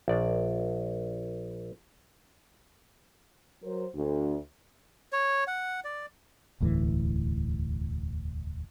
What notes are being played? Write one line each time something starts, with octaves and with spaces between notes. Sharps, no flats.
A#1 D5
F#3 A#4 C5
D2
C#5
F#5
D5
E1 D2 A2 E3